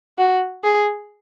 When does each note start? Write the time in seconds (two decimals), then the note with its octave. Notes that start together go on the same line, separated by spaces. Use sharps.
0.18 F#4
0.64 G#4